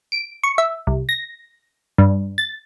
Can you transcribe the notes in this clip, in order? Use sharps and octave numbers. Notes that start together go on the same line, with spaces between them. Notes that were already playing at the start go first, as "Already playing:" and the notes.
D7
C#6
E5
C2
A#6
G2
A6